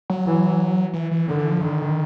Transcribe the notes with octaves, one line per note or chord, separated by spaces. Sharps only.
F#3
E3
E3
E3
D3 D#3
E3
F3
D3 D#3